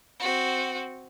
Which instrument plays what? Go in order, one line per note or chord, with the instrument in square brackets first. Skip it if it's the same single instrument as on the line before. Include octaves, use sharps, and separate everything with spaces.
[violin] C4 F#4